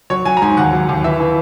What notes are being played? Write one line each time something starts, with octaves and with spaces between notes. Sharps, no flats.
F#3 C#5
F#3 G#5
A#5
G#2 G#5
D#2 F#5
F#3
D#2
E3 E5
E3